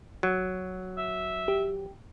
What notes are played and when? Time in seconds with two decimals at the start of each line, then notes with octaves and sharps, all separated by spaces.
0.23 F#3
0.97 E5
1.48 G4